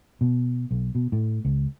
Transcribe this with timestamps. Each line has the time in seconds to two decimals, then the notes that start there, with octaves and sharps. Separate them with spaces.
0.21 B2
0.71 B1
0.95 B2
1.12 A2
1.45 C#2